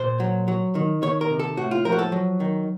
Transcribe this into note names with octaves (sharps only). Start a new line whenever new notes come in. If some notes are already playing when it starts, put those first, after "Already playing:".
Already playing: A#2 C5
F#3
F#3
D#3
D#3 C#5
A#4
C3
A4
A2 F#4
F4
F3 A#4
F#4
A4
F#3
D#3